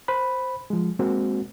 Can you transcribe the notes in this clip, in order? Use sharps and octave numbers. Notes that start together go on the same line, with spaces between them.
C5 B5
F3 G#3
G#3 A#3 C4 F#4